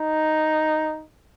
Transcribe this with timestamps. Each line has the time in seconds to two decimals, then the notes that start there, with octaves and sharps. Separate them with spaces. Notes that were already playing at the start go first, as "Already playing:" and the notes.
Already playing: D#4